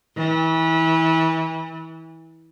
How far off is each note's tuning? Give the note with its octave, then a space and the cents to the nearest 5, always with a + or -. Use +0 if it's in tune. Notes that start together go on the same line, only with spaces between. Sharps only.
E3 -30